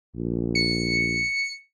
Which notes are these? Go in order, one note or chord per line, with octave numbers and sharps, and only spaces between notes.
A#1
C#7